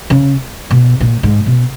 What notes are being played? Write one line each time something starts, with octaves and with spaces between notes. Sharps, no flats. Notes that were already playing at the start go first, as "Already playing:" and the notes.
C#3
B2
A#2
G#2
B2